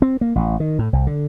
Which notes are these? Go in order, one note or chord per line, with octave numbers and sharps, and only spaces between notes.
C4
A#3
A1
D#3
A2
C2
D3